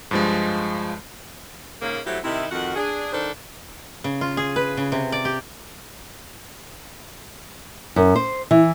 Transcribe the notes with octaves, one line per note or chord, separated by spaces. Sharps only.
G2 F3 G#3
G#2 C#3 A#3
F#3 A3 C4 E4 G4
C3 D#3 D#4 E4
F2 D#3 F#4 F#5
D4 G#4
D#3 D4 A4 C5
C#3
F4
G#4
B4
C#3
C3
D5
G4
F#2
C5
E3